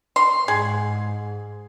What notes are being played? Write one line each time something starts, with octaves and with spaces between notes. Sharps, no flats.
C6
G#2 G#4